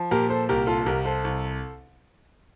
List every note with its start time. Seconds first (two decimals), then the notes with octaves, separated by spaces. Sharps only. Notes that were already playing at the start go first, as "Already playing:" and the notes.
Already playing: F3
0.11 A#2 G4 A#4
0.30 A4 C5
0.49 C2 G4 A#4
0.67 F4 A4
0.81 A4
0.86 C2 G4 A#4
1.05 A4 C5
1.24 C2